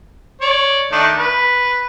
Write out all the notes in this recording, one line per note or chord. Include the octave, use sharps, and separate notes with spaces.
C#5 D5
D#3 A3 D4
B4